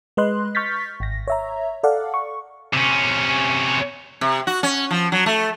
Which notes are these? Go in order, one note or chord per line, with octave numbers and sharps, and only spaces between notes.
G#3 B4 D#5 C6 F#6
C#6 F6 G6 A6 B6
G#1 A#6
C#5 E5 A#5
A4 D5 F5 F#5
C#6
C3 C#4
C3
F#4
C#4
F3
F#3
A3